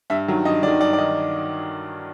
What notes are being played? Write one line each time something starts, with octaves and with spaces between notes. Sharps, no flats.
G2 E5
D#3 F#3
G2 D#5
D#3 F#3 D5
G2 D5
D5
D#3 D#5